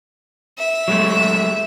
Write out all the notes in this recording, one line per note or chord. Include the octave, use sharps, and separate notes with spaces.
E5
F#3 G#3 A3